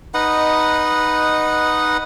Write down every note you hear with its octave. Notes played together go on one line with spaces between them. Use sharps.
D#4 B4 D#5 F#5